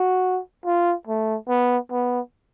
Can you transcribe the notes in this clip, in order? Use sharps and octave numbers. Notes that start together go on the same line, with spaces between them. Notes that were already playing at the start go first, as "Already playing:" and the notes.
Already playing: F#4
F4
A3
B3
B3